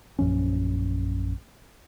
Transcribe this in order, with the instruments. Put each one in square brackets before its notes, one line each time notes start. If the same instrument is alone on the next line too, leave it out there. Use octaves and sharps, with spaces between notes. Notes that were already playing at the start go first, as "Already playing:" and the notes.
[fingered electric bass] A#1 F#2 F3 C#4